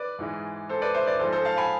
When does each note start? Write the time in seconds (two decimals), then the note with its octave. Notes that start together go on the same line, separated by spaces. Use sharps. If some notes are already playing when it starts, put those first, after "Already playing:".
Already playing: B4 D5
0.19 G#2 E3 G#3
0.69 A4 C5
0.82 B4 D5
0.94 C5 E5
1.06 B4 D5
1.19 G#2 F3 G#3 A4 C5
1.32 A4 C5
1.45 F5 A5
1.58 G#5 B5